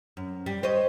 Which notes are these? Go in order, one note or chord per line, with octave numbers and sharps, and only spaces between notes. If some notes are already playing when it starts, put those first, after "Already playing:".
F#2
G3
C5 C#5 D#5